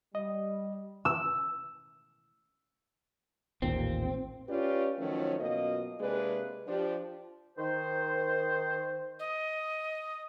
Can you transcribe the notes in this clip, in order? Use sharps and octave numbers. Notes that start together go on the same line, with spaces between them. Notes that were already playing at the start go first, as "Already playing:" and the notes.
G3 D#5
E6
A1 D#2 A#2 C4
C#4 F4 G4 B4 C#5 D5
D#3 F3 F#3 A3 C#4
F#2 B2 A#3 F4 D#5
C3 G#3 A#3 D4 G#4 B4
F3 D4 G4
D#3 C5
D#5